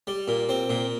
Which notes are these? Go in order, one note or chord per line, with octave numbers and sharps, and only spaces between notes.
G3
A#2
C4
A#2